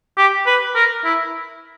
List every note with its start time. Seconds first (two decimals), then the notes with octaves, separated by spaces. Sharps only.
0.18 G4
0.46 B4
0.75 A#4
1.05 E4